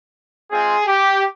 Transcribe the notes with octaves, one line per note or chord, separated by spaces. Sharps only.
G#3 C4 F4 G#4
G4